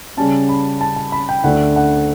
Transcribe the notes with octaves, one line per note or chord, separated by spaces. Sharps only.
C#3 G3 C#4 A5
B5
A5
A5
B5
G5
D2 D3 A3 D4 F#5
F#5